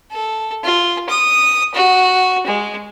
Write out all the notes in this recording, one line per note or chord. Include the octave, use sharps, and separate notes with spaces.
A4
F4
D#6
F#4
G#3